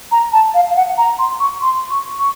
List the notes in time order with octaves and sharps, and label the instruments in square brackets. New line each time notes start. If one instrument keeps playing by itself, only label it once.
[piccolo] A#5
A5
F5
F5
F#5
A#5
C6
C#6
C6
C#6
C#6